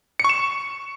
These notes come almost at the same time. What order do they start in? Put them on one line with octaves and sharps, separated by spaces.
C#7 C#6 E7